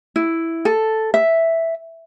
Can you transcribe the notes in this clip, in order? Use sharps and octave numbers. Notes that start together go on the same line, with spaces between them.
E4
A4
E5